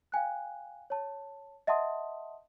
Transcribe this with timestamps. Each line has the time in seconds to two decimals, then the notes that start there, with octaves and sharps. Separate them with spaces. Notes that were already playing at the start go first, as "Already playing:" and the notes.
0.12 F5 G5 G#5 F#6
0.90 C#5 A5
1.67 D#5 E5 F#5 A5 C6 D#6